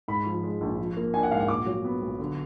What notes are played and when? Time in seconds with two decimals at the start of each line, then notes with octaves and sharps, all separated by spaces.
0.08 G#2 B5
0.26 F3
0.43 G#3
0.61 A#1
0.78 F3
0.97 A#3
1.14 D4 G#5
1.23 F#5
1.31 G#2 F5
1.40 F#5
1.48 A#2 D6
1.66 F#3
1.85 B3
2.02 B1
2.19 D3